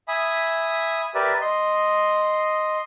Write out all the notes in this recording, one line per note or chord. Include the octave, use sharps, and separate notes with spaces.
E5 G#5 B5 D#6
G4 A#4 B4 D5 E5
D#5 C6